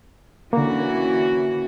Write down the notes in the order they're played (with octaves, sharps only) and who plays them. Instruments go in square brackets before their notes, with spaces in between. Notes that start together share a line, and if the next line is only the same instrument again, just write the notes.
[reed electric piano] D3 A#3 [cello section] E3 C#4 F#4